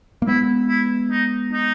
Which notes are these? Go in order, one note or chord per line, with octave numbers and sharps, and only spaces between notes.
A#3
G#3 B3 E4
E4
D#4
D#4